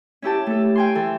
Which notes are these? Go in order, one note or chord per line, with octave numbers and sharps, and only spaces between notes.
C#4 E4 G4 A5
A3 A4
G5 G#5 C6
E3 A4